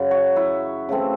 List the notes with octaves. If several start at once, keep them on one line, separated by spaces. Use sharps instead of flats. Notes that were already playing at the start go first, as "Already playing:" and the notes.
Already playing: F#2 C#3 F#3
F#4
E4
C#3 E3 A3 C4